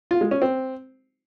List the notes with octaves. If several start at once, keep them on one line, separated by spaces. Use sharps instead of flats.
F4
G#3
C#4
C4